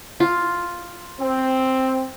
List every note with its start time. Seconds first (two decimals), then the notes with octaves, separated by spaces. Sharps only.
0.20 F4
1.20 C4